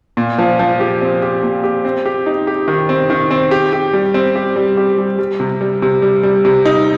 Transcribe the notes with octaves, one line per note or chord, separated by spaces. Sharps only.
A#2
F3
F3
G4
C4
G4
A#2
G4
C4
G4
D#4
G4
D#3
C4
D#3
C4
G4
G4
G3
C4
G4
G3
G4
G3
G3
C3
G3
C3
G3
G3
C3
D#4